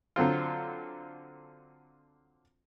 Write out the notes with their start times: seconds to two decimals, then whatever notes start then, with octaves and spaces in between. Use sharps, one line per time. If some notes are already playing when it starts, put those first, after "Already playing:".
0.16 D3 F#3 C4 F4